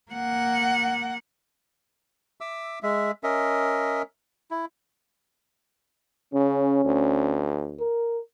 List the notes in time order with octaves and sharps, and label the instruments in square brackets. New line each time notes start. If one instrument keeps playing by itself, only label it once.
[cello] A#3 F#5
[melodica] E5 D6 E6
G#3 E5
C#4 A#4 D#5 E5
E4
[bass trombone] C#3 [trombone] C#4
[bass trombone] D2
[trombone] A#4